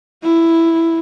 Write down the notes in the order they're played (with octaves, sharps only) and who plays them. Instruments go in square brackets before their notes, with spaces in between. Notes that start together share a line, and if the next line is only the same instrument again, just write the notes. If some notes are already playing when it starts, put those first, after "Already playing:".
[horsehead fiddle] E4